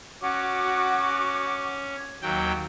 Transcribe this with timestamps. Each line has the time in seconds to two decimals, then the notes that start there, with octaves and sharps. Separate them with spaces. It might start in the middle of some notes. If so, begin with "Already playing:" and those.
0.22 C#4 F#4 D6
2.22 D#2 F#3 G5